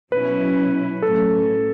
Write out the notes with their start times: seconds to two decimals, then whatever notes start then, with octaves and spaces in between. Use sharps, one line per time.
0.12 B2 F#3 C#4 E4 B4
1.02 A2 F#3 C#4 A4